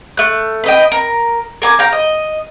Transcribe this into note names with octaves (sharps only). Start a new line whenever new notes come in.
A3 F#6
B4 D#5 G5
A#4
A#4 G#5 D6
F5 G5 A#5
D#5